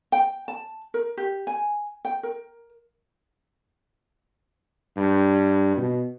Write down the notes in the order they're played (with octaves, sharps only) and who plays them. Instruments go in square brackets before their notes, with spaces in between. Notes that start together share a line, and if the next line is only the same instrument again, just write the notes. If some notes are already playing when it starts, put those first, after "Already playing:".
[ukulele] G5
A5
A#4
G4
G#5
G5
A#4
[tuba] G2
B2